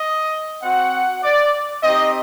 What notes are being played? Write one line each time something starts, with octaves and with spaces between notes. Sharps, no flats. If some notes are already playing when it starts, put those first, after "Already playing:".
Already playing: D#5
C4 F#4 F#5
D5
C4 D#4 G4 D#5